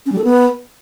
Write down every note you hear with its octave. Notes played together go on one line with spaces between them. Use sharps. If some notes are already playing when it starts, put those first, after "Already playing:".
C#4
G3
A4
B3